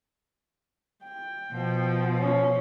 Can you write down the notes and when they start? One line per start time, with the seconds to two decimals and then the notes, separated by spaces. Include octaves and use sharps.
1.04 G5
1.52 B2 F3
2.16 C#4